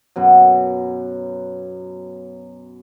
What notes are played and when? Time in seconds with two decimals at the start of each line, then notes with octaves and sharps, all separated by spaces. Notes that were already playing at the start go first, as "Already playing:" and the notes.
0.16 F#2 B2 F#3